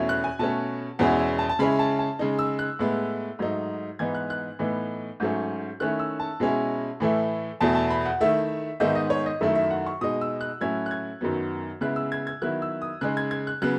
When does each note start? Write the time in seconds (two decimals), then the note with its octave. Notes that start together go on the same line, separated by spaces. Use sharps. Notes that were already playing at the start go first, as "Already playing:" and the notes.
Already playing: E2 B2 A3 C#4 E4
0.09 F#6
0.24 G#5
0.39 B2 A3 C#4 A5
0.99 E2 B2 G#3 C#4 E4 F#5
1.19 E5
1.39 A5
1.49 A5
1.59 C#3 G#3 C#4 E4 B5
1.79 A5
1.99 A5
2.19 C#3 G#3 D#4
2.39 E6
2.59 F#6
2.79 A2 G#3 B3 E4
3.39 G#2 F#3 A3 D#4
3.99 G#2 E3 B3 D#4 G#6
4.15 F#6
4.30 F#6
4.59 A2 E3 B3 D#4
5.20 G#2 F#3 A3 C#4
5.80 D#3 A3 C#4 E4 F#6
5.99 E6
6.20 A5
6.40 B2 G#3 C#4 E4
7.00 A2 E3 A3 E4
7.60 E2 B2 A3 E4 A5
7.75 A5
7.90 B5
8.05 F#5
8.20 D#3 A3 E4 E5
8.80 G#2 D#3 G#3 B3 D#4 E5
8.95 D#5
9.10 C#5
9.26 D#5
9.41 F#2 D#3 F#3 A3 E4 E5
9.55 E5
9.70 F#5
9.86 C#6
10.01 B2 G#3 D#4 D#6
10.21 E6
10.41 F#6
10.61 A2 F#3 C#4 E4 G#6
10.86 F#6
10.91 G#6
11.21 F#2 D#3 F#3 B3
11.81 C#3 G#3 B3 E4 F#6
11.96 E6
12.12 G#6
12.27 G#6
12.42 D#3 F#3 B3 E4 F#6
12.62 E6
12.82 D#6
13.01 C#3 G#3 D#4 F#6
13.17 G#6
13.31 G#6
13.47 F#6
13.62 C#3 F#3 B3 F#6